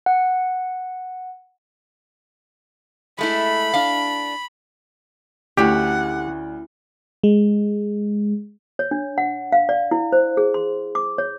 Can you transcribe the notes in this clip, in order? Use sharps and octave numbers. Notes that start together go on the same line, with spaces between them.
F#5
G#3 A3 E4 B5
D4 F5
D2 C#4 E4 G4 A4 F#5
G#3
C#5
D4
F#5
F5
D5
E4
C5
G#4
C6
D6
C#5